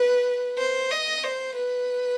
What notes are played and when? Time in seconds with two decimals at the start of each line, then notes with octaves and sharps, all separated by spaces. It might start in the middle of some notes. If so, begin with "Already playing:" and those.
Already playing: B4
0.58 C5
0.91 D#5
1.24 C5
1.56 B4